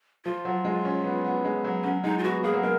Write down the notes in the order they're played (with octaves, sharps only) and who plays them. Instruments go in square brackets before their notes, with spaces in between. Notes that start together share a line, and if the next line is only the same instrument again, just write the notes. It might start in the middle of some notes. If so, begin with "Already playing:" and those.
[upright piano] F3 [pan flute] F4
[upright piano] F#3
G#3
C#4
B3
B3
G#3
F#3
[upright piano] F#3 [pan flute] C#4
[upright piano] G#3 [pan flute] D#4
[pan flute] F4
[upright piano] B3 [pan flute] F#4
[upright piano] A#3 [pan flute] G#4
[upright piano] F#3
[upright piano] G#3 [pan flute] A#4